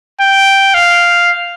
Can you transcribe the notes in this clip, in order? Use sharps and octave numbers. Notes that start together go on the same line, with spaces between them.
G5
F5